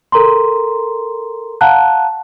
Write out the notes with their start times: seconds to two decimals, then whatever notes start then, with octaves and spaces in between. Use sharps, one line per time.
0.12 A4 A#4 A#5 C6
1.61 F5 F#5 A5 A#5 F#6